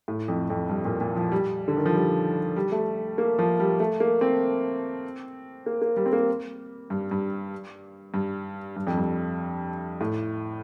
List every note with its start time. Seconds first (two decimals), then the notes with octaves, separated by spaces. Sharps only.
0.08 A2
0.28 F2
0.50 F2
0.69 G2
0.85 A#2
1.01 A#2
1.16 F3
1.32 G3
1.68 D3
1.77 D#3
1.86 F3
1.95 G3
2.56 G3
2.72 A3
3.18 A#3
3.39 F3
3.60 G3
3.80 A3
4.00 A#3
4.21 C4
5.66 A#3
5.82 A#3
5.97 G3
6.06 C4
6.13 A#3
6.90 G2
7.11 G2
8.14 G2
8.76 G2
8.87 F2
8.97 G2
10.01 A2